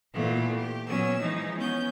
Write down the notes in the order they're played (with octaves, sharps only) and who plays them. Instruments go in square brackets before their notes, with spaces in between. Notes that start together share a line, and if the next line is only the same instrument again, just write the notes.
[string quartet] A#2 E3 A3 B3 F4
G4
A#2 F#3 B3 C#4 E6
E3 F3 G#3 D#4
B3 C#4 G6